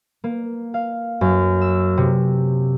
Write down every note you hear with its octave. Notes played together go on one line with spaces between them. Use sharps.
A#3
F5
F#2
E6
C3